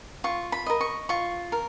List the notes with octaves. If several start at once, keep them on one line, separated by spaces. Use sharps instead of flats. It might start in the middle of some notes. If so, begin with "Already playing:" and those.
F4 C#6
B5
A#4 D#5
C#6
F4 C#6
A#4